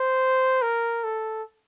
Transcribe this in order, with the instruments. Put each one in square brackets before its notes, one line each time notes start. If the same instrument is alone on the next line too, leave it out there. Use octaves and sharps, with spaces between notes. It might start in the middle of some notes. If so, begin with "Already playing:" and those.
Already playing: [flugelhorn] C5
A#4
A4